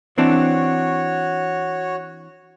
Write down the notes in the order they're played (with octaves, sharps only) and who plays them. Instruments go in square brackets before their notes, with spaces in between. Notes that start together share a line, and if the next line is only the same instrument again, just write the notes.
[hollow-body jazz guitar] E3 C4 D4 [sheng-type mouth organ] F#4 C#5